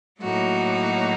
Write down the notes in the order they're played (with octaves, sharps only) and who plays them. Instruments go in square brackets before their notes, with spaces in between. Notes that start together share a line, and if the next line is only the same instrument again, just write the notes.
[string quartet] A2 F#3 A#3 D#4 F#4